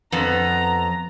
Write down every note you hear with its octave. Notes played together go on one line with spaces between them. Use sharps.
F2 B3 A#5